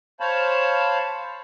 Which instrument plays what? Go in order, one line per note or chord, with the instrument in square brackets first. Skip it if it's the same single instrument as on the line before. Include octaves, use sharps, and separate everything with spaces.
[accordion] C5 C#5 F5 A5 B5